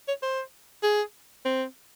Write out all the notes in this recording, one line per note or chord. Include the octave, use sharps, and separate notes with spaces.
C#5
C5
G#4
C4